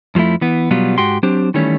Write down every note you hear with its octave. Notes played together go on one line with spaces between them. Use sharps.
F2 F3 G3 A3 E4
E3 B3
B2 F#3 G3 B3 F4
G#2 F#4 G4 C6
F#3 C4 D4 G4 C5
D#3 E3 G3 A3 C#4